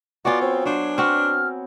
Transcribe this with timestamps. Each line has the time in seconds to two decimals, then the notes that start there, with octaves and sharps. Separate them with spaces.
0.25 F#3 B3 F4 F#4 D5 G#5
0.41 C4 C#5
0.65 F#3 D4 C5
0.98 C4 F#4 F6